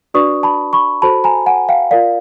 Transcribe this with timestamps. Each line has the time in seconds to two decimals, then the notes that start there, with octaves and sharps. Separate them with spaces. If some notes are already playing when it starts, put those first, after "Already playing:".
0.14 D4 F#4 B4 D5 C#6 D#6
0.43 A5 B5
0.73 B5 C#6
1.02 F#4 A4 C5 A5 B5
1.24 G#5 A#5
1.46 F#5 G#5
1.69 F5 G5
1.91 F4 A#4 D5 F5